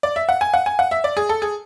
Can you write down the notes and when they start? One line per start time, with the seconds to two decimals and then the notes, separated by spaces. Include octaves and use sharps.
0.03 D5
0.16 E5
0.29 F#5
0.41 G#5
0.54 F#5
0.66 G#5
0.79 F#5
0.91 E5
1.04 D5
1.17 G#4
1.29 A4
1.42 G#4